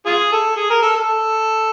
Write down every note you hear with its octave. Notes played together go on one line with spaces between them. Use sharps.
F4 G#4
A4
G#4
A#4
A4
A4